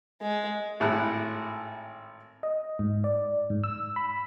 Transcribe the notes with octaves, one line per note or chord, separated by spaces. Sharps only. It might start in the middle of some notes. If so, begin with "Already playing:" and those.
G#3
G#1 A2 E4 F#6
D#5
G#2
D5
G#2
E6
B5